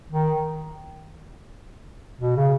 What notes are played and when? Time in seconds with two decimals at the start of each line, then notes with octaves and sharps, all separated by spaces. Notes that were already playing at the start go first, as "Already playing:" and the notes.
0.12 D#3
2.21 B2
2.36 C#3